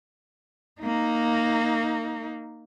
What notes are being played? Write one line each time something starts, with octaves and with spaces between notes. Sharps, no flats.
A#3 D#4